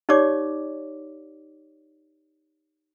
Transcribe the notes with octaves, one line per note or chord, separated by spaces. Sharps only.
D#4 G4 C#5 D5 D6